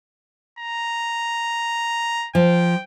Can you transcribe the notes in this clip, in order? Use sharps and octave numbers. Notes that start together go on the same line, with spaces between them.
A#5
F3 G5